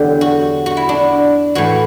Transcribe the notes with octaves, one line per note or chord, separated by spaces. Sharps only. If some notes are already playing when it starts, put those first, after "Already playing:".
Already playing: E2 D3 F#3 G4
F#4
F#4
E4
D4
A2 E3 F#4